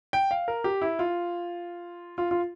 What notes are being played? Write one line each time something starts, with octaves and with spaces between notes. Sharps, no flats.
G5
F5
A#4
G4
E4
F4
F4
F4